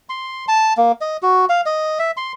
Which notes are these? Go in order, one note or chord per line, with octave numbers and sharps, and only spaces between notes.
C6
A5
A#3
D#5
F#4
F5
D#5
E5
C6